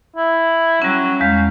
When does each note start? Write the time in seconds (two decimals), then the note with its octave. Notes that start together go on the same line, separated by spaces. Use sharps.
0.16 E4
0.82 F#3 G3 C#4
1.21 E2 G#3 F5